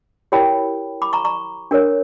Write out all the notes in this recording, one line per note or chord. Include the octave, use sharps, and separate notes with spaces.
E4 G4 A#4 C#5 G5 B5
B5 D6
A#5 C#6
A#5 C#6
D4 A#4 C#5